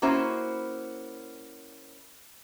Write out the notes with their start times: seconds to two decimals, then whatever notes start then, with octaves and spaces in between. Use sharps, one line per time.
0.02 A#3 C#4 E4 F#4 C5